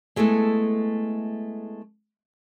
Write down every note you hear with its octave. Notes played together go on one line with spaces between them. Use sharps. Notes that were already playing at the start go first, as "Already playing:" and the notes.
G#3 A3 B3 E4 A4